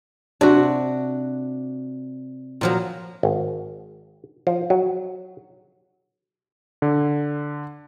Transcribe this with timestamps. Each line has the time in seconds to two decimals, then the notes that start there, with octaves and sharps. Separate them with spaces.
0.41 C3 D4 F#4
2.61 A#2 F3 F#3
3.23 G#1
4.47 F3
4.70 F#3
6.82 D3